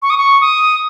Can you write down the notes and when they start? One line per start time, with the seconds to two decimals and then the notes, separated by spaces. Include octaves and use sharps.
0.02 C#6
0.10 D#6
0.18 C#6
0.41 D#6